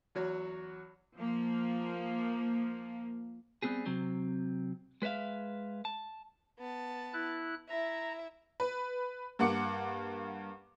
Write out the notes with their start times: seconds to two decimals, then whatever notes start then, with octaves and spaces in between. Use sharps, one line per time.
0.15 E2 F#3 F#4 C#5
1.16 F3 A#3
3.62 G3 B3 C4 G4 G#4
3.86 C3 F#3 C4
5.02 G#3 B4 C5 E5 F5
5.85 A5
6.59 B3 A5
7.13 E4 F#6
7.69 E4 E5 A#5
8.60 B4
9.39 G2 A#3 F#5 D6 C#7